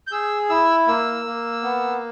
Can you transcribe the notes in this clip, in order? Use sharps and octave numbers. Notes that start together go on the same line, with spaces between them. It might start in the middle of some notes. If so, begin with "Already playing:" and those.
G6
G#4 E6
E4 E6
A#3 E6
A#3
B3